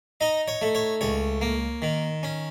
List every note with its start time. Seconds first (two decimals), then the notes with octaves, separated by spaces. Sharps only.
0.21 D#4 D#5
0.48 C#5
0.62 A3
0.75 C#5
1.01 C#2 C#5
1.41 A#3
1.82 D#3
2.23 C#4